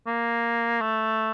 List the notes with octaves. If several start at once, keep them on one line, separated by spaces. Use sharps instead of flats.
A#3
A3